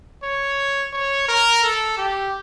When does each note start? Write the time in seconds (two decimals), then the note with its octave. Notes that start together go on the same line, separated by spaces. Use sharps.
0.23 C#5
0.93 C#5
1.28 A#4
1.63 A4
1.97 G4